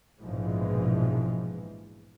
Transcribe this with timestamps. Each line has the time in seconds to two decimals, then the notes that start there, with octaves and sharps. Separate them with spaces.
0.21 A#1 G#2 B2 E3 F3 G#3